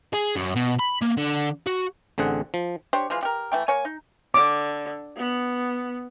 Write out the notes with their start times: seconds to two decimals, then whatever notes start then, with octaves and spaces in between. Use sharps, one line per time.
0.14 G#4
0.36 F#2
0.55 B2
0.79 B5
1.02 A#3
1.17 D3
1.67 F#4
2.18 A1 D3 C4 G#4 F#5
2.54 F3
2.93 D4 G4 C5 C#5
3.10 E3 F3 G#3 F4
3.23 G4 A#4
3.52 E3 A3 G5
3.68 A#3 C#5 G#5
3.85 D#4
4.34 D3 D6
5.17 B3